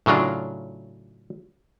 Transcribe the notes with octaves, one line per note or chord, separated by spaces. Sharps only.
A2 C#3 F#3 D4 F4